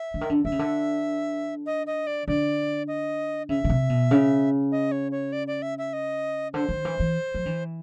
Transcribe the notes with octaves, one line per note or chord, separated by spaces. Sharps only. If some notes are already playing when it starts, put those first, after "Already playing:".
Already playing: E5
D3
D#3
D3
D3 E5
C#3
D3
D#5
D#5
D5
D3 D5
D#5
C#3 E5
C#3
C3
B2
C#3
D#5
C#5
C#5
D5
D5
E5
E5
D#5
D3 C5
D#3
E3
E3
F3
E3